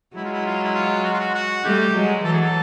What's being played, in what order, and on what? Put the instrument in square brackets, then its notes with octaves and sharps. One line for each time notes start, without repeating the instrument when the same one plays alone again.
[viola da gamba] F#3 G#3 [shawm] E4
[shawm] F4
E4
F4
E4
F4
F#4
F4
F#4
F#4
[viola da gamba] G3 A3 [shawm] G4
[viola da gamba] F#3 G#3
[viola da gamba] E3 F#3 [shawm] A4
[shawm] G#4
A4